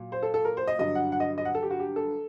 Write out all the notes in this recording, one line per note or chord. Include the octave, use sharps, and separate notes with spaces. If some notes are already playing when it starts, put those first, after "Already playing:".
Already playing: A#2 F#3
C5
A4
A4
A#4
C5
D#5
G2 D3 F#3 D#5
F#5
F#5
D#5
D#5
F#5
A4
G4
F#4
G4
A4